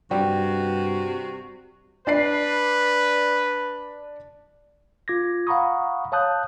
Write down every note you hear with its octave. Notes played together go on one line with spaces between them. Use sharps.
G2 C3 G3 F#4
D4 B4 D5 C7
F4 D6 G#6 A#6
F5 F#5 A#5 B5 C#6 D#6
C#5 F5 A5 D#6 F#6 G6